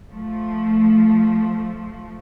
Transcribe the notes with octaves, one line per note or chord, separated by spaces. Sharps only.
F3 A3